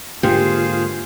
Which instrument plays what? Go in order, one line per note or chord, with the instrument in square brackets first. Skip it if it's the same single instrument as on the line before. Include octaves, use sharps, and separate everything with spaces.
[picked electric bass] G#2 D3 A#3 [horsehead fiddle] F4 [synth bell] G4 [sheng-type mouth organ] G#4 C5 F5